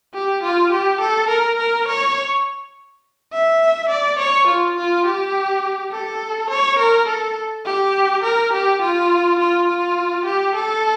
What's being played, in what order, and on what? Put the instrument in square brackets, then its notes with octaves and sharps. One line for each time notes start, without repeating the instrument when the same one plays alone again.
[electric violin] G4
F4
G4
A4
A#4
A#4
C#5
E5
D5
C#5
F4
F4
G4
A4
C#5
A#4
A4
G4
A#4
G4
F4
F4
F4
G4
A4